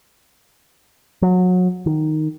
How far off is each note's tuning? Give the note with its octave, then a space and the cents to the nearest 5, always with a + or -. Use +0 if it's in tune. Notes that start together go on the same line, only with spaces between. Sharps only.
F#3 -25
D#3 -5